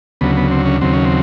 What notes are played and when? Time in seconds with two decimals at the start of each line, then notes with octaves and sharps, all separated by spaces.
0.21 D2 C#3 F#3 B3
0.37 B3
0.51 C4
0.66 C#4
0.81 D#2 C#3 F#3 C4
0.93 C#4
1.05 C4